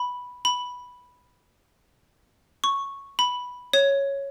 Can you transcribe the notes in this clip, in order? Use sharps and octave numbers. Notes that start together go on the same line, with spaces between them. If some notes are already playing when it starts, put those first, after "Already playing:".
Already playing: B5
B5
C#6
B5
C#5